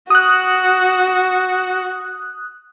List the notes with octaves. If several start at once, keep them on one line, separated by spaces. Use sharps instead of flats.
F#4 D#6 F#6